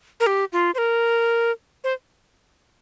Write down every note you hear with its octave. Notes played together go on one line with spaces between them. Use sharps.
A#4
G4
F4
C5
A#4
C5